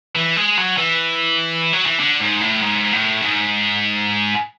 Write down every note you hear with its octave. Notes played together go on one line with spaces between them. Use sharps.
E3
G#3
F#3
E3
F#3
E3
D3
G#2
A2
G#2
A2
G#2